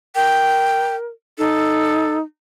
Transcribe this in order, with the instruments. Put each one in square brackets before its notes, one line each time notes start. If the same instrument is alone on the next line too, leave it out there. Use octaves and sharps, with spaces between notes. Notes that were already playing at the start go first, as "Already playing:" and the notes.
[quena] A#4 [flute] G5
[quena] D#4 [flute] A4